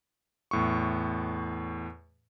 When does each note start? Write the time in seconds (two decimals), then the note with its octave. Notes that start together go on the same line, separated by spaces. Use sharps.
0.51 E2 A2 C#6